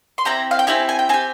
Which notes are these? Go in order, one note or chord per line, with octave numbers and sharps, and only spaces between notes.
C6
C4 E4 G4 A#5
F5
G5
C4 E4 G4 G#5
G#5
G5
C4 G4 G#5